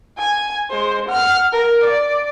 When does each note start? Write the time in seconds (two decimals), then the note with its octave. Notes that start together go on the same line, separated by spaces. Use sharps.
0.18 G#5
0.70 G#3 C5
1.09 F#5 F6
1.52 A#4
1.84 D5